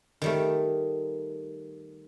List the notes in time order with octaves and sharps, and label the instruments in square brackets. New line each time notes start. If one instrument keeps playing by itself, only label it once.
[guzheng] D#3 G3 A3